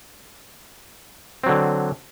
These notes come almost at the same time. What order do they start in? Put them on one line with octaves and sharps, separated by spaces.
C4 F#3 D3